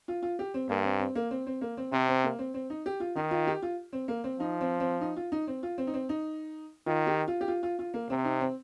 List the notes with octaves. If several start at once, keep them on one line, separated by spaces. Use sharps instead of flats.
F4
F4
G4
C4
G2 A#3
C4
C4
A#3
C4
C4
A#3
C4
C3 C4
C4
A#3
C4
C4
D#4
G4
F4
D#3 D#4
F4
G4
F4
C4
A#3
C4
F3 D#4
C4
C4
D#4
F4
D#4
C4
F4
C4
D#4
C4
D#4
D#3 F4
G4
F4
G4
F4
F4
F4
A#3
C3 C4
D#4
C4